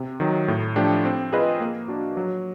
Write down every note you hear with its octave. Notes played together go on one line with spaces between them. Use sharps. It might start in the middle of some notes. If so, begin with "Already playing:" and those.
Already playing: C3
D#3 F#3
A2
F3 A3 D4 G4
C4
F4 G#4 B4 D#5
A#3
D4 F#4
F#3